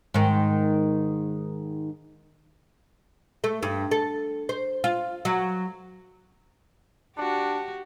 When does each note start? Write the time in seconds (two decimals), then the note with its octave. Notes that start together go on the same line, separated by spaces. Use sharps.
0.14 G#2 D#3
3.44 A3
3.63 G2
3.91 A4
4.49 C5
4.84 F4
5.25 F#3
7.17 D4 F#4 G4